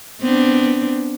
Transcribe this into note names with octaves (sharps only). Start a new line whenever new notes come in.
B3 C4 D4